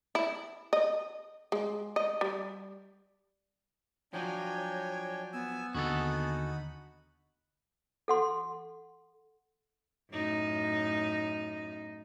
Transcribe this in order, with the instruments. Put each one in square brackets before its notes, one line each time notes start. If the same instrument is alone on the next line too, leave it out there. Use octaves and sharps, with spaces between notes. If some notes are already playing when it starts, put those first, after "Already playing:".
[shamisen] E4
D#5
G#3
D#5
G3
[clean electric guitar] F3 F#3 [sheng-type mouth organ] D4 G5 G#5 [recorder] C#5
[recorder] B3 [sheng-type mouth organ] G#5 E6
[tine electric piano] D#2 D3 [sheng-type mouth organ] D#4 F#5 B5 [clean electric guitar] F#4 G#4 A4
[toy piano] A4 F#5 C6
[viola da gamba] F#2 A2 D#4